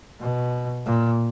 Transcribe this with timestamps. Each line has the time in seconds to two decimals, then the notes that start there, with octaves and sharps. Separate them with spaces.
0.21 B2
0.86 A#2